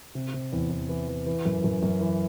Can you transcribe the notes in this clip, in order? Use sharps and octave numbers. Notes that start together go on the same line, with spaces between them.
C3
C3
E2
E2
E3
E3
E3
F#2
F#2
F#2
E3